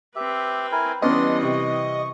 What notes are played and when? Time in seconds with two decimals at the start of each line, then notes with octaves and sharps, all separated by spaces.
0.16 C4 G4 B4 E5
0.72 E4 A#4 G#5
1.02 E3 G3 B3 C#4 D4 D5 D#5 C6
1.43 C3 C#6